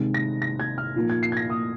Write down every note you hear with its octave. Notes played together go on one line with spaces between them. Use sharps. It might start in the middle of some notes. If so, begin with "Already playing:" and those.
Already playing: C3 D#3 G#3 C4
A#6
A#6
G#6
F6
A#2 F3 A#3 D#4
G#6
C7
G#6
A#6
D#6